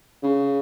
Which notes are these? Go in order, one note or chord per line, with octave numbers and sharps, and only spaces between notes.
C#3